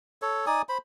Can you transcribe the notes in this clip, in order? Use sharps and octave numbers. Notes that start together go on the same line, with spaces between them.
A4 C#5
D#4 D5 G#5 D#6
C5 B5